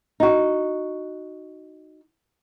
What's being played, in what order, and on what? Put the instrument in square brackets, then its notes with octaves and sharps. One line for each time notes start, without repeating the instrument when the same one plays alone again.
[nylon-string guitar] D#4 F#4